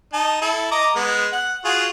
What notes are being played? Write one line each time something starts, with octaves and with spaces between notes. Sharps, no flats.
D#4 A5
E4 A4
D#5 A#5 D6
G#3 B3
F#5
F4 F#4 G#4